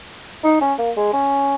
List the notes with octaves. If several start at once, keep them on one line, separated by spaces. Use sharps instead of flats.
D#4
C#4
A#3
G#3
C#4